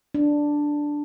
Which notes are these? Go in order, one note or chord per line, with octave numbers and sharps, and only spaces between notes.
D4